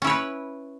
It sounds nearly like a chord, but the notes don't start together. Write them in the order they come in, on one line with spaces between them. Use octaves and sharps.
C#4 E4 C#5 B4